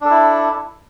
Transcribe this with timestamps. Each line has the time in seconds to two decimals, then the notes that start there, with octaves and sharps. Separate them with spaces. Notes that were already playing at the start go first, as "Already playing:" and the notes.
0.01 D4
0.05 A4
0.10 E4